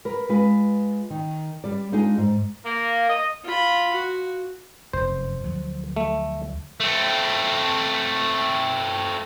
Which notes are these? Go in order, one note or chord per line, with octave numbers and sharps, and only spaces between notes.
A#4 B4
G#3 F4 B4
D#3
G3 D5
G#3 D4 D#4 F4 G#4
G#2
A#3
D#5
F4 B5
F#4
F1 F#2 C5
D2 F3 F#3
A3
A3 C4